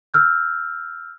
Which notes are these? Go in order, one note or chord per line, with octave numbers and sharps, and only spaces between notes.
E6 F6 G6